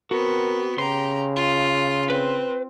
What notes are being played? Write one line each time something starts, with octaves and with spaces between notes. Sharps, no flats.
B3 C4 F#4 A#4
C#3 G4 A#5 C6
F4
C4 B4